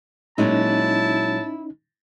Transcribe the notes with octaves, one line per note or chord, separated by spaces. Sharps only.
A#2 F#3 G#3 C#4 D#4 E4 A5